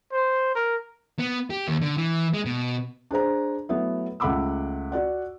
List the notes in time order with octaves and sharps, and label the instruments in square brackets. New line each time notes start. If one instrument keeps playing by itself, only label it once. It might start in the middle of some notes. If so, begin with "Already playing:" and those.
[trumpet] C5
A#4
[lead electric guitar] B3
G4
D#2
D3
E3
G#3
B2
[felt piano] D4 G#4 C5 A#5
F#3 A3 B3 E4
C#2 A3 F#5 B5 D6 E6
F#4 D5 F#5